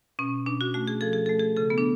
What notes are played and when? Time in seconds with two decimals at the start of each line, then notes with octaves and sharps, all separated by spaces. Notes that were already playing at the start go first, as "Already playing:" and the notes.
0.19 B2 C#4
0.46 B2 D4
0.61 F#4
0.74 A3 F#4
0.88 G#4
1.01 F3 A4
1.13 G#4
1.26 A3 A4
1.40 G#4
1.57 C#3 A4
1.70 B3
1.78 D4